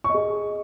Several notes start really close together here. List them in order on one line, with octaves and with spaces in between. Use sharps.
C#6 D#5 G#4